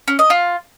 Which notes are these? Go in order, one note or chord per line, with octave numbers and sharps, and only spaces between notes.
C#4
D#5
F4